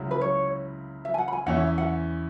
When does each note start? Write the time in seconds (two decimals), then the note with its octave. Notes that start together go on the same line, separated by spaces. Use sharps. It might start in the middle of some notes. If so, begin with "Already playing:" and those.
Already playing: C#2 C#3 F#3 E4
0.11 B4
0.21 C#5
1.05 E5
1.14 G#5
1.18 F#5
1.28 B5
1.33 G#5
1.46 E2 E3 C#4 E4 F#5
1.57 C#5
1.67 E5
1.78 F#5